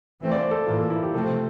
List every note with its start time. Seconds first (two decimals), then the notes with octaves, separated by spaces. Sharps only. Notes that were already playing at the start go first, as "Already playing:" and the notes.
0.20 E3 A3 C4
0.32 D5
0.36 C5
0.51 A4
0.67 A2 E3 A#3 F4
0.78 A4
0.90 E4
1.03 G4
1.14 C3 F3 A3 C4 A4